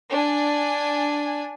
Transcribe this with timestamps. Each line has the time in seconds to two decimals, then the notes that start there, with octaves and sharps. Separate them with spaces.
0.10 D4 G#5